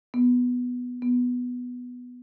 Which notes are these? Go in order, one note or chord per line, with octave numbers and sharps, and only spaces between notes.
B3
B3